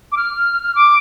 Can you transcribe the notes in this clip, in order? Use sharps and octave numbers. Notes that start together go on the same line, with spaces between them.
D6
F6
D6